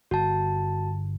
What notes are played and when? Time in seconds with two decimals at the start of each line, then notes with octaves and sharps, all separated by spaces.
0.11 G1 F#4 A5